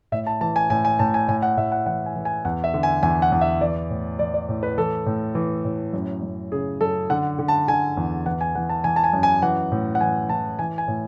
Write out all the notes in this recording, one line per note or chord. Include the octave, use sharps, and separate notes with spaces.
A2 E5
A5
E3 A5
G#5
A2 G#5
G#5
A2 A5
G#5
A2 G#5
F#5
A2 E5
F#5
E3 F#5
G#5
E3
G#5
E2 F#5
E5
D3
G#5
E2 G#5
F#5
E2
E5
E3 D5
A2
E3 D5
D5
A2
B4
E3 A4
A2
E3
A2
F#2
F#2
C#3 G#4
F#2 A4
D3 F#5
D3
A5
D3 G#5
E2
E3 F#5
G#5
E3 F#5
A5
E3 G#5
A5
G#5
F#2
G#5
E3 F#5
A2
F#5
E3 G#5
E3 A5
E3 G#5
G#5
A2